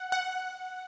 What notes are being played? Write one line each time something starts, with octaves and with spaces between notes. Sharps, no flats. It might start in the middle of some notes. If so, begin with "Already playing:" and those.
Already playing: F#5
F#5